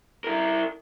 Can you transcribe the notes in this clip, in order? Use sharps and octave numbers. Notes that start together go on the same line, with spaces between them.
E4 A#4